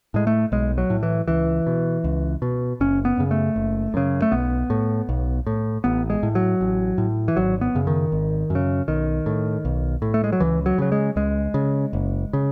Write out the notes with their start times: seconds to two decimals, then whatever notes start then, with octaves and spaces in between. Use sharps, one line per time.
0.14 A2 G#3
0.27 A3
0.52 B1 G#3
0.78 F#3
0.90 A2
1.03 E3
1.28 C#2 E3
1.67 B2
2.04 C#2
2.42 B2
2.81 F#1 C#4
3.05 B3
3.18 F#2 C#3
3.31 A3
3.56 F#1
3.94 F#2 C#3
4.22 A3
4.32 B1 B3
4.70 A2
5.09 B1
5.47 A2
5.84 A1 B3
6.10 G#3
6.23 A2
6.35 F#3
6.61 A1
6.98 A2
7.28 E3
7.36 G#1 F#3
7.61 B3
7.75 F#2 C#3
7.87 D#3
8.12 G#1
8.50 F#2
8.55 C#3
8.88 B1 D#3
9.26 A2
9.65 B1
10.02 A2
10.14 A3
10.24 G#3
10.32 F#3
10.40 C#2 E3
10.66 F#3
10.78 C#3 F#3
10.92 G#3
11.16 C#2 G#3
11.54 C#3
11.93 F#1
12.33 C#3